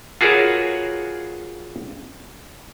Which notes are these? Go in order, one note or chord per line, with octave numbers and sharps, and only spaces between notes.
F4 F#4 G#4 A#4 B4 C#5